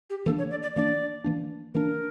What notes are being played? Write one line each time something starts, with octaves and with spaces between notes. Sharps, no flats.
G4
E3 A#3 D4 A4
C#5
D5
D5
E3 A#3 D4 D5
E3 A#3 D4
E3 A#3 D4 A#4